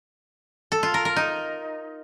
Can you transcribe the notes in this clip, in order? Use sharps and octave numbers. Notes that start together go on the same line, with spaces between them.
A4
F4
A#4
A#4
D#4